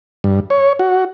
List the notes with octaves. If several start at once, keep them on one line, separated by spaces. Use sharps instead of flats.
G2
C#5
F#4